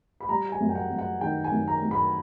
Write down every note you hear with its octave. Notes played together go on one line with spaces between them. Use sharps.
B5
G3 A#5
G#5
F#2
G5
F#5
F#2
F#5
D#3 G5
G#5
F#2
A#5
F#2
B5